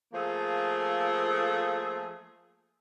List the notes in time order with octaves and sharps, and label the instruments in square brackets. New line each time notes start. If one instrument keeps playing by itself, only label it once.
[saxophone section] F3 A3 A#3 G#4 A4 C5